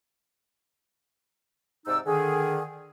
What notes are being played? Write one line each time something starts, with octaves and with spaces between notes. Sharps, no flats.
G#2 C3 D#4 D5 E6
D3 D#3 G#4